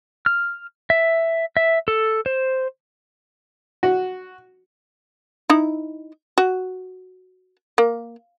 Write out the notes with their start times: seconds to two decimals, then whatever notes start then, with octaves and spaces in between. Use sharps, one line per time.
0.26 F6
0.90 E5
1.57 E5
1.88 A4
2.26 C5
3.83 F#4
5.50 D#4 E4
6.38 F#4
7.78 A#3